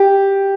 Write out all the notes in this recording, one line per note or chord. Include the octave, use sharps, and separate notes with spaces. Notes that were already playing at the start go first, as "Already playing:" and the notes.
Already playing: G4